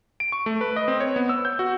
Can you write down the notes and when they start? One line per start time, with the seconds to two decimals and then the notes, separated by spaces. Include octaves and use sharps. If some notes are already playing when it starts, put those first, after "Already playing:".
0.20 D7
0.32 C#6
0.46 A3
0.61 B4
0.76 D#5
0.88 C4
1.00 C#5
1.16 B3
1.29 E6
1.45 G6
1.59 F#4